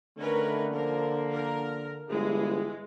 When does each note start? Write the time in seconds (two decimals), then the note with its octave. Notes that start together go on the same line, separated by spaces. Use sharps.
0.18 D3 D#3 A3 C#4 A#4 B4
0.72 F3 A#3 A#4
1.33 A#4
2.09 G1 E3 G#3 G#4